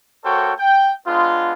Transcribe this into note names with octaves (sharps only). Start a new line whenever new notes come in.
A#3 F#4 A4 C5 C#5 G5
G5
G#3 B3 D4 F4